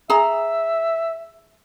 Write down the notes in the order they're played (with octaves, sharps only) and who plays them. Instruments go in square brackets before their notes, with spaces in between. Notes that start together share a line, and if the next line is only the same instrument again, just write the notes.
[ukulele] G#4 A#5 [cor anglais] E5